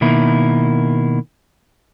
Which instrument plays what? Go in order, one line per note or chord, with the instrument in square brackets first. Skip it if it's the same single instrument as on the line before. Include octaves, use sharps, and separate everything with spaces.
[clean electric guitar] B2 D#3 A#3 E4